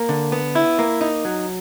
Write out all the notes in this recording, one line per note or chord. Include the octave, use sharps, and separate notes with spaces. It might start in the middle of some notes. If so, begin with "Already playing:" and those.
Already playing: A#3
D3
B3
E4
A#3
D#4
F#3